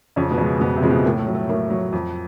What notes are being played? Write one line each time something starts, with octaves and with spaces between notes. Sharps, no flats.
F2 C#3 C#4
B2 B3
C#3 F3 G#3
F2 B2 B3
C3 C4
C#3 F3 G#3
B2 B3
A2 A#3
A3
F#3
A3
A2 A#3
F#3
F2